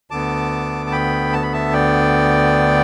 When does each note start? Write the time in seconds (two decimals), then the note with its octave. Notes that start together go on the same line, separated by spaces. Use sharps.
0.10 D2 D3 B3 A5 D6
0.86 A5
0.92 G5 B5
1.33 A5
1.43 B5
1.53 E5 A5
1.73 D5 G5